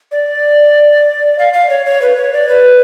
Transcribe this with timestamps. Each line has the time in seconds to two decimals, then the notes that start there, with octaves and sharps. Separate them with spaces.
0.12 D5
1.39 F5
1.53 F5
1.70 C#5
1.86 C#5
2.02 B4
2.17 C#5
2.33 D5
2.49 B4